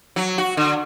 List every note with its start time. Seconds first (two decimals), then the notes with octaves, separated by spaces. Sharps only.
0.16 F#3
0.38 F#4
0.57 D3